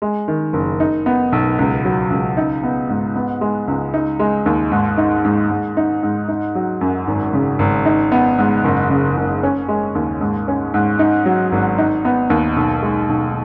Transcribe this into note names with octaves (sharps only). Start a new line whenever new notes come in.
G#3
D#3
F#1
D#4
B3
B1
C#2
F#3
C#2
D#4
B3
G#2
B3
G#3
C#2
D#4
G#3
D#2
G#2
D#4
G#2
G#2
D#4
G#2
D#4
F#3
F#2
G#1
C#3
G#1
D#4
B3
G#2
F#1
C#3
F#1
C#4
G#3
D#2
G#2
C#4
G#2
D#4
F#3
G#1
D#4
B3
D#2
B1
G#3
B1